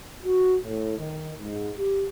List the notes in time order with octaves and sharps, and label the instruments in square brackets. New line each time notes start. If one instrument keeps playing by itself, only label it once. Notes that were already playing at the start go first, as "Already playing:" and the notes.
[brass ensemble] F#4
A2
D#3
G#2
G4